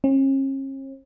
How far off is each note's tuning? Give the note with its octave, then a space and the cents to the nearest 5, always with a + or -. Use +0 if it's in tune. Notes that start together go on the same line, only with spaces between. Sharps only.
C#4 -45